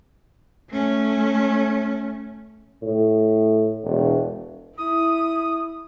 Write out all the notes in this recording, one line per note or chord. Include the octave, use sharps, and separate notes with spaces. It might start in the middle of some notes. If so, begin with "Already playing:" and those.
A3 C#4
A2
E1
E4 D#6